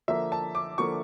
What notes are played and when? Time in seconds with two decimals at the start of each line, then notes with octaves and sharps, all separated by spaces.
0.08 D3 F3 A#3 E5
0.32 A5
0.55 D6
0.78 D3 F3 A#3 C#6